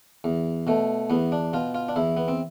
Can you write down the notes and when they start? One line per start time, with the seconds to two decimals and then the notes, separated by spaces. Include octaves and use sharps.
0.24 E2
0.67 B2 A3
1.10 E2 B3
1.32 D4
1.53 B2 F4
1.75 F4
1.89 D4
1.96 E2 E4
2.17 B3
2.28 C4